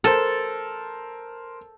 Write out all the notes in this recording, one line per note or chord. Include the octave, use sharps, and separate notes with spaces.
A4 A#4 C5